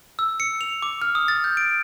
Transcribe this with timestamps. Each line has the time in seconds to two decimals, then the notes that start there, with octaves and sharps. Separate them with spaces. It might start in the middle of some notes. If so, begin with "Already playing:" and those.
0.19 E6
0.40 C#7
0.61 F7
0.82 D6
1.02 F6
1.15 D#6
1.28 A6
1.44 G6
1.57 D7